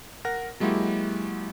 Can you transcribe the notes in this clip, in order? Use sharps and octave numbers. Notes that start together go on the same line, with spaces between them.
A#4 F#5 A#6
F#3 G#3 A#3 E4 F#4 G4